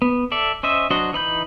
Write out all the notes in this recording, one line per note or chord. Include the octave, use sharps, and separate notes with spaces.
B3
A4 D5 E5
C#4 C5 D#5 E5
F#3 D4 F#4 C5 D#5
E3 D#4 B5 G6